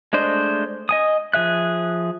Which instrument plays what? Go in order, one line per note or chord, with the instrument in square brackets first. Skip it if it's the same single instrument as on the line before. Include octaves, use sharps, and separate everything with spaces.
[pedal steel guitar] G#3 A3 D4 C5 D#5
D#5 G#5 D#6
F3 G#4 E5 F#6